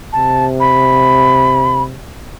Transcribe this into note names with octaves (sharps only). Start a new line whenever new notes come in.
C3 A5
B5